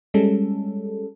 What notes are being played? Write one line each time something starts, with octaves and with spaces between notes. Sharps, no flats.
G3 G#3 C#4 A4